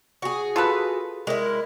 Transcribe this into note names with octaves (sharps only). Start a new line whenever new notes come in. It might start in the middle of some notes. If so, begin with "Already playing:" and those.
F#4 G#4
F4 A4 B4
G#3 E4 A#4